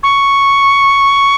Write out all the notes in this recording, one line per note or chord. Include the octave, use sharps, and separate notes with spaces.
C#6